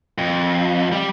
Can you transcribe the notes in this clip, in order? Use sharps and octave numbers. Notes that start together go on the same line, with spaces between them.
F2
G3